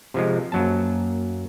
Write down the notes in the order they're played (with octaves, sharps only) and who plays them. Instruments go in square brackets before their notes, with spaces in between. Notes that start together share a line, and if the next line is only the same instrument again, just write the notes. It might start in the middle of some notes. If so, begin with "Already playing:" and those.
[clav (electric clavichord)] C3 F3 G#3
[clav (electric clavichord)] F#2 F#3 A5 [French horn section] A#3